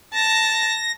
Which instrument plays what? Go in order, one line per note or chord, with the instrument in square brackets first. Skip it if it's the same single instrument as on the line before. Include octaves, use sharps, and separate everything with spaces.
[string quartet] A5 [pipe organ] A#6